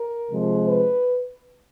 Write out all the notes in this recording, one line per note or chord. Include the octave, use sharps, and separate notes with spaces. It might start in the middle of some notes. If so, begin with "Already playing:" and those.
Already playing: A#4
C3 F3 G#3
B4